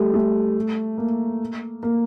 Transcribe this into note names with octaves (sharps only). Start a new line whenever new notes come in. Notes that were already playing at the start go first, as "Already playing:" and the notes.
Already playing: G3 A3
A3
A#3
A#3